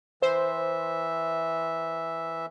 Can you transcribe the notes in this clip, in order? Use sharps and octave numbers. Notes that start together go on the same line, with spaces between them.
E3 C5 E5